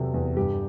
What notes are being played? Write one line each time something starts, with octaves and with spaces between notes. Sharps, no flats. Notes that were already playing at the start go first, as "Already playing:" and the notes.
Already playing: E2 C3 F#3 A4
E2
G2 G4